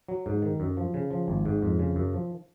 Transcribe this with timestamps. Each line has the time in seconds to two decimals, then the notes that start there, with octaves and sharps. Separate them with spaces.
0.09 F#3
0.26 G#2
0.42 D#3
0.60 F#2
0.77 F3
0.94 C#3
1.11 F3
1.28 G#1
1.46 G#2
1.63 F2
1.79 C#3
1.96 F#2
2.13 F3